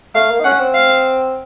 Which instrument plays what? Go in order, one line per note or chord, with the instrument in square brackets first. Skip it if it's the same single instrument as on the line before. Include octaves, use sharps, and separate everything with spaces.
[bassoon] A3 [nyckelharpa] F5
[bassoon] A#3
D#4
[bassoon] C#4 [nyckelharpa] F#5
[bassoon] C4
[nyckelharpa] F5